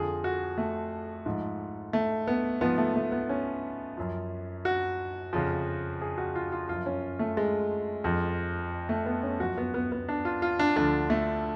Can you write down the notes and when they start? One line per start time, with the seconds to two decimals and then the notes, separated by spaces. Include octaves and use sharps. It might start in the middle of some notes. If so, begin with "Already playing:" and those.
Already playing: F2 D3 F3 G#4
0.24 F#4
0.58 A3
1.26 G#2 F3
1.93 A3
2.27 B3
2.61 G#2 F3 B3
2.78 A3
2.96 A3
3.12 B3
3.29 C#4
3.97 F#2 F3
4.65 F#4
5.33 F2 C#3 F3
6.02 G#4
6.18 F#4
6.35 F4
6.52 F4
6.68 F#2 F3 F4
6.86 C#4
7.19 A3
7.37 G#3
8.04 F2 F3
8.89 A3
9.06 B3
9.23 C#4
9.40 F#2 F3 F#4
9.58 B3
9.74 B3
9.92 B3
10.09 D4
10.25 F4
10.42 F4
10.59 D4
10.76 D2 D3 F3 D4
11.10 A3